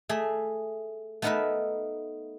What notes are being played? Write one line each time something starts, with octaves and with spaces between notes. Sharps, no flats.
A3 G#4 E5
A3 B3 D#4 A#4 B4 E5